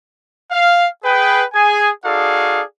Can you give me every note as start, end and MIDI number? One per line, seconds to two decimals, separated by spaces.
0.51 0.87 77
1.04 1.43 68
1.04 1.43 71
1.04 1.43 79
1.54 1.90 68
1.54 1.90 80
2.05 2.61 63
2.05 2.61 66
2.05 2.61 68
2.05 2.61 69
2.05 2.61 74
2.05 2.61 77